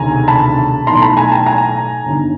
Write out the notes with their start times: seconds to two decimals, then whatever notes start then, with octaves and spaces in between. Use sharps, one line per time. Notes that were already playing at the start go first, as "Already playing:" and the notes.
Already playing: E1 D2 C3 D#3 G#5 A#5
0.28 A5 B5
0.87 B1 A2 E3 A#5 C6
1.02 A5 B5
1.17 G#5 A#5
1.31 G5 A5
1.46 G#5 A#5
2.06 G1 G2 D#3